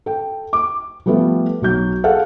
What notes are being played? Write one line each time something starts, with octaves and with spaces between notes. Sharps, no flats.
A4 G5
D6
F3 G3 A3 B3 F4
B1 F#3 G6
G#4 A4 F5 F#5